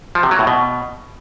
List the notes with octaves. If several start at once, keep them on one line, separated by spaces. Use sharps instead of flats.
F3
C3
F#3
A2
B2